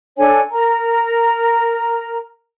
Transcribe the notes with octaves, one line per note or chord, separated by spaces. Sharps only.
D4 A4 C#5 G#5
A#4 A#5